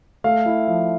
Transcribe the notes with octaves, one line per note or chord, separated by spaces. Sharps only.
A3 F5
E4
F3